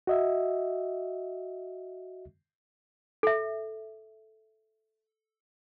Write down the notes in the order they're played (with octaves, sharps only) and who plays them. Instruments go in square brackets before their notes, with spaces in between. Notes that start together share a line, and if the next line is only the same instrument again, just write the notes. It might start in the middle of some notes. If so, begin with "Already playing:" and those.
[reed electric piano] F#4 D#5 E5
[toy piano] A4 E5